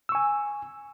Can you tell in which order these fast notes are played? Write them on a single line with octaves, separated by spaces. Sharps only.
E6 C#6 G#5